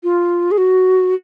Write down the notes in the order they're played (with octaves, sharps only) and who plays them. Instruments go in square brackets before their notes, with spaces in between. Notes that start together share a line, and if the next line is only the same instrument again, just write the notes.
[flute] F4
G#4
F#4